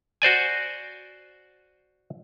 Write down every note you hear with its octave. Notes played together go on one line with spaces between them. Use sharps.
F#4 C5 D5 G#5